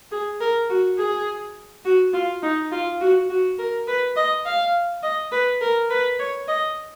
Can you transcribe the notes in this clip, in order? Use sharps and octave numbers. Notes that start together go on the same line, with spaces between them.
G#4
A#4
F#4
G#4
F#4
F4
D#4
F4
F#4
F#4
A#4
B4
D#5
F5
D#5
B4
A#4
B4
C#5
D#5